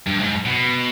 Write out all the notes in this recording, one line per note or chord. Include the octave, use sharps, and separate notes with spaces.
G2
G#2
B2